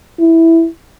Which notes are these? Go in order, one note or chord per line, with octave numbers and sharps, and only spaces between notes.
E4